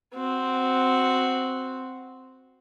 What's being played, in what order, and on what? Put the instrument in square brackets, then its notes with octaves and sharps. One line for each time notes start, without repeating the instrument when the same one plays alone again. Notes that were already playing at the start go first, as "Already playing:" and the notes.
[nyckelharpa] C4 F#4